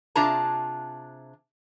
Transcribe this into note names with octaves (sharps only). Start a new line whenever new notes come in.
C3 D4 F4 G#4 A5 A#5